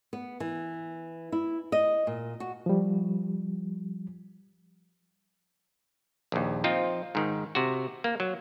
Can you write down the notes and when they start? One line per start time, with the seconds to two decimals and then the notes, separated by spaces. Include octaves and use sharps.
0.13 B3
0.40 E3
1.32 E4
1.72 D#5
2.07 A#2
2.40 F#4
2.66 F3 G3
6.32 A#1 D#2
6.64 F3 C4 D#4 F4
7.15 G#2 D#3
7.55 C3 F#4
8.04 A#3
8.20 F#3